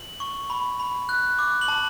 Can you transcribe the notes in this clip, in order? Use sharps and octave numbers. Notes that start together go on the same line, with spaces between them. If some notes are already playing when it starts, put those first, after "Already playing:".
Already playing: F#7
C#6
B5
B5
F#6
D6
F#7
A5